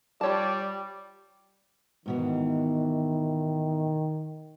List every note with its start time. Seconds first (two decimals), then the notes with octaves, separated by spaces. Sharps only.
0.21 G3 F4 C#5 D5 A5
2.06 G#2 B2 D#3 E3